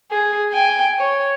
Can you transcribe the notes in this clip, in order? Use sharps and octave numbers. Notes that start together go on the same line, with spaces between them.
G#4
G5 G#5
C#5